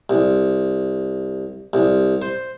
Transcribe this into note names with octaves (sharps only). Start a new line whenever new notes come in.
C2
C2
C5